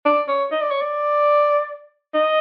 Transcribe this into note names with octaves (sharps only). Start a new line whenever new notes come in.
D5
C#5
D#5
D5
C#5
D5
D#5